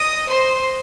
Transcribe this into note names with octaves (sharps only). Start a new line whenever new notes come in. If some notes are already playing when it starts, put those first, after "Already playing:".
Already playing: D#5 D#6
C5 C6